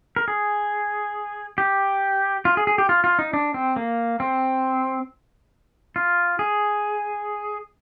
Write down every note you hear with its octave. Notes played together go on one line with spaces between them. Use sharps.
A#4
G#4
G4
F4
G#4
G#4
G4
F4
F4
D#4
D4
C4
A#3
C4
F4
G#4